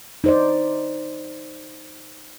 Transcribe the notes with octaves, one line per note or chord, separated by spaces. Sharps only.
D#4 C5 D5